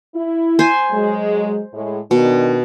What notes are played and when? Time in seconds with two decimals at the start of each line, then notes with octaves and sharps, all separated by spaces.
0.15 E4
0.59 C5 G#5
0.91 F#3 G#3
1.74 A2 G#3
2.11 B2 D#3 D4